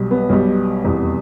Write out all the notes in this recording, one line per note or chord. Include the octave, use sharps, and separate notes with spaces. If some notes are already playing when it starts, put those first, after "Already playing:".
Already playing: B1 B2 G3
B3
B1 B2 G3
F1 E2 B2 G3